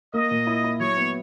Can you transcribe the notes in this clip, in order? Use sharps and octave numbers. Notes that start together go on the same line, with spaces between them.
A#3 D#5
A#2
E4
E4
F#3 C#5
B3